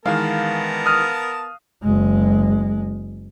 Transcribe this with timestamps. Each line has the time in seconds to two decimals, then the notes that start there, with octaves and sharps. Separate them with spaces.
0.06 D#3 E3 G#3 B3 A#4 F5 A5
0.86 D#6 F6
1.83 F#1 G#3